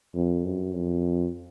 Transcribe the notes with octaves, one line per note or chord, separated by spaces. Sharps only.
F2
F#2
F2